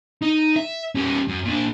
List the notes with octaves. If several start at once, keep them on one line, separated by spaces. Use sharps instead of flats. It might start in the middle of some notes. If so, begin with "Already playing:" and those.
D#4
E5
G3 C#4
F#2
A#2 D4